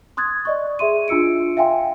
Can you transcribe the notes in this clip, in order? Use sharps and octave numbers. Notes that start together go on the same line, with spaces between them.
C6 D#6 F#6 G#6 A6
D5 D#5 C#6
G#4 E5 C6 D#7
D4 F4 E6 C#7 D7
E5 F5 G5 G#5 C6